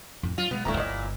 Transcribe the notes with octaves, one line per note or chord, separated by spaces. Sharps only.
F2 A2
F#3 F4
B2 F#3 G#3 B3
D1 A#2 G#3 A3 D4 E4 A#5
G1 F4 C#5 D#5